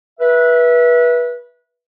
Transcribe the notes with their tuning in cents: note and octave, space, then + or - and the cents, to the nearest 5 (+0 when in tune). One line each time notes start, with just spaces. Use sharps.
B4 -25 E5 +0